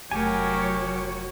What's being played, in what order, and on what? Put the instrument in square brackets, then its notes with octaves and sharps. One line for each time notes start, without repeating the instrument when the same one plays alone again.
[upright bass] F1 A3 [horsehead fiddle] F#3 C#5 [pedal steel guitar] F#4 G#5 [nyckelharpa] G4 A#4